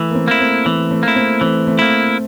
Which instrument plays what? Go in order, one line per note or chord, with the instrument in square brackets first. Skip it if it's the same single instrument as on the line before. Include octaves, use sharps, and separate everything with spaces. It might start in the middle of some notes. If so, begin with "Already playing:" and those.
Already playing: [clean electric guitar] E3 [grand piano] A3
[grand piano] A#3
A3 C4
[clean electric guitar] A#3 E4
[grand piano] A3 C4
[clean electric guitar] E3 [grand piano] A3 C4
[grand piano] A3 C4
[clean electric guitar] A#3 E4
[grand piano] A3 C4
[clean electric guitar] E3 [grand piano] A3 C4
[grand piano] A3 C4
[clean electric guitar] A#3 E4